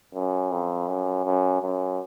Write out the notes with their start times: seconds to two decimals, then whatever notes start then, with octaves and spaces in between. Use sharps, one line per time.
0.15 F#2
0.51 F2
0.88 F#2
1.25 F#2
1.62 F#2